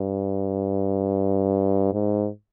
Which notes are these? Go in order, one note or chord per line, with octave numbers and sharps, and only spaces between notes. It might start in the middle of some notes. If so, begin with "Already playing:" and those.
Already playing: G2
G#2